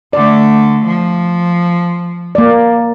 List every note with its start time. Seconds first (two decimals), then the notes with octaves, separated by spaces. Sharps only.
0.13 D3 A3 D5
0.84 F3
2.35 A#3 D5